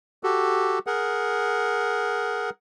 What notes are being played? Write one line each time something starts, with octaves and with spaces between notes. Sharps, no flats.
F#4 G4 A4
G#4 A#4 F#5